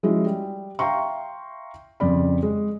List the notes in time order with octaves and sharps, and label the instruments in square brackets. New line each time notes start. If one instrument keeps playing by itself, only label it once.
[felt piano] F3 G#3 C#4 E4 F#4
G3
E5 F5 G5 A#5 C6 C#6
F2 C#3 D5 B5
G#3